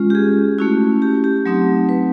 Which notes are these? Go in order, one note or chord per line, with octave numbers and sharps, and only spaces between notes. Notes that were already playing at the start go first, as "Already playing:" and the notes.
Already playing: G#3 C#4 F4
G4
G#4
A3 C#4 E4 F#4
G4
G4
F#3 A3 C4 D#4
B4